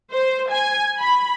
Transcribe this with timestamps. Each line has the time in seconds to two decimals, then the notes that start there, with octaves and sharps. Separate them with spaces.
0.12 C5
0.50 G#5
0.99 B5